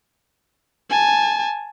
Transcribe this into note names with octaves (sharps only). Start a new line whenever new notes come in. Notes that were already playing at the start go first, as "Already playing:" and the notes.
G#5 A5